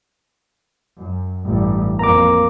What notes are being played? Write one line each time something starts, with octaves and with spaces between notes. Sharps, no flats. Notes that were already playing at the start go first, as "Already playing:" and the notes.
F#2
A1 G2
F2 A#3 A#5 D6